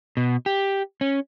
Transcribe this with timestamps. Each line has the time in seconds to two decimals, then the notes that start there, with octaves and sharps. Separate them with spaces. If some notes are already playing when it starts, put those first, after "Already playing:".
0.17 B2
0.46 G4
1.01 C#4